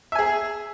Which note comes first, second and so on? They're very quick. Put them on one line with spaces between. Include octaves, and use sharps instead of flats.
E5 G#5 G#4